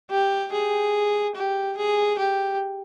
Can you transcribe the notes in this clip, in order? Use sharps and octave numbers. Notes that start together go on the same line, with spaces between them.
G4
G#4
G4
G#4
G4